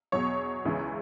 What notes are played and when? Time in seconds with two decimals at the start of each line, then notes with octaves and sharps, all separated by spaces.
0.12 E2 B2 F#3 C#5
0.65 C#2 C#3 E3 G#3